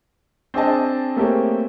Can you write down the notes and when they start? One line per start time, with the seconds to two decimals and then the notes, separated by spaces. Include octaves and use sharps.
0.54 C4 D4 G#4 D#5 A5
1.16 A3 A#3 C4 G4 G#4 C#5